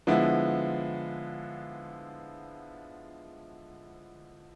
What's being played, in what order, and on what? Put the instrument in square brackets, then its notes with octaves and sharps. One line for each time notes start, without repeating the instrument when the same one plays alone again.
[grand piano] D3 F3 G#3 B3 E4